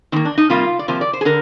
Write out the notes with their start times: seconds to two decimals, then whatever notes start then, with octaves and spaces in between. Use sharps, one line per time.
0.12 D#3 C4
0.16 A#3
0.25 D4
0.38 D#4
0.50 C3 G3 A#3 F4
0.79 D5
0.88 C3 F3 A#3 C5
1.01 D5
1.13 C5
1.21 G#4
1.25 D3 A#4